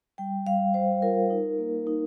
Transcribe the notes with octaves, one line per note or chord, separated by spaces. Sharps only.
G3 G5
G3 F5
G3 C5
F4 A#4
D#4
A#3
D#4